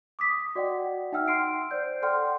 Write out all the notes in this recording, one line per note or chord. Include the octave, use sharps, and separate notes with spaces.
D6 D#6 B6
F#4 D5 D#5 F#5 G5
D#4 E5 F#5 G5 E6 F6
C6 F6 C7 D7
C5 D5 G6
A4 D5 F#5 G5 C6 F6